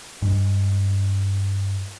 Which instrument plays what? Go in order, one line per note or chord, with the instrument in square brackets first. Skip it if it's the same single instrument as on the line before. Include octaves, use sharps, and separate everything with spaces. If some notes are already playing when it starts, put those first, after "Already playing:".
[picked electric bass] G2 G#3